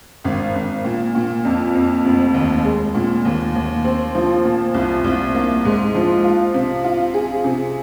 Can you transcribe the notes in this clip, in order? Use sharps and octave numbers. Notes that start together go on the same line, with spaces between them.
G#1
G#1
A#2
A#2
F2
F2
F1
D#2
G#3
A#2
D#2
D#2
C4
F3
A#2
C2
C2
A#3
G#2
F3
F4
C3
F4
G#4
C3